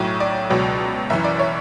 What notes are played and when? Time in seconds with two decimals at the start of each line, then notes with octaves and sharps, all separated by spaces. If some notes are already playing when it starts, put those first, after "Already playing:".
Already playing: B1 A2 F#3 C#5
0.20 D5
0.50 C#2 B2 F#3
1.10 F#1 F#2 E3 E5
1.24 D5
1.39 C#5